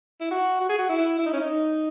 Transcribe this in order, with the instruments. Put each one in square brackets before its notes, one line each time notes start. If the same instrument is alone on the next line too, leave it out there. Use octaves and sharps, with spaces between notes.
[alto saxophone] E4
F#4
F#4
G#4
F#4
E4
E4
D#4
C#4
D#4